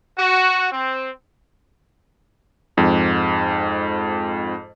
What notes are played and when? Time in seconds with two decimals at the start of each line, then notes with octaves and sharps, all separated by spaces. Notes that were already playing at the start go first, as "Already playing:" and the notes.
0.17 F#4
0.71 C4
2.77 F2 G#2